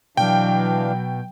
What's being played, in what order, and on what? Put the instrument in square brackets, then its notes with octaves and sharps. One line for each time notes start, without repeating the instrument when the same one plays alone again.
[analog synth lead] B2 [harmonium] E3 D4 F5 [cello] F#3 [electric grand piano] G5